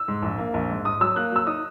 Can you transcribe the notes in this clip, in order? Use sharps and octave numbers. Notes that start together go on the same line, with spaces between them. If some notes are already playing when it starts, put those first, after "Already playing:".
Already playing: E6
G#2
A#1
A#3
A#1
G#2
G#2 D#6
F#3 E6
A#3 F#6
F#3 E6
D#4 D#6